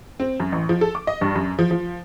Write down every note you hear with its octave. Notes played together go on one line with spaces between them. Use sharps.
C4
F#2
A1
F3
A4
D6
D#5
G2
F#2
F3
F3